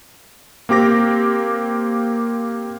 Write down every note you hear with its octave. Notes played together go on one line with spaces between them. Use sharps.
A#3 C4 G4 D6 A#6